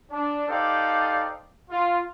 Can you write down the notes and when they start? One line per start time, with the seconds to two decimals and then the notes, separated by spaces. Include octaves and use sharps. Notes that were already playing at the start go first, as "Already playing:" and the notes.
0.11 D4
0.49 D#4 G4 A4 C5 D5 F5
1.71 F4